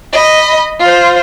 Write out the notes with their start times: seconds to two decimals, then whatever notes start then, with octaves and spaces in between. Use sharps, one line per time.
0.12 D#5 B5
0.79 F4 C5